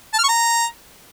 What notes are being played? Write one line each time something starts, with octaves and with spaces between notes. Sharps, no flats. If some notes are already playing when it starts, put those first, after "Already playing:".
A5
F6
C#6
A#5